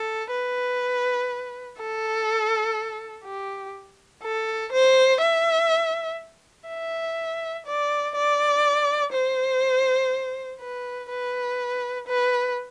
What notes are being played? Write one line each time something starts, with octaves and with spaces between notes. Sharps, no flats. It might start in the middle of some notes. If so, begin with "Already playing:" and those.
Already playing: A4
B4
A4
G4
A4
C5
E5
E5
D5
D5
C5
B4
B4
B4